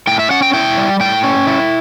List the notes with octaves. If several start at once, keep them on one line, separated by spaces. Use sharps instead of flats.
A2 G5
E5
C#4 F#5
G5
E4 G5
G3
A2 G5
C#4
E4